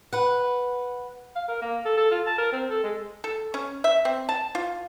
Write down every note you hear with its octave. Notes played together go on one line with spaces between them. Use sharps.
B4 F#5
F5
A#4
A#3
A4
A4
F4
A5
A#4
C4
A4
G#3
A4
C#4
E5
C4
A5
F4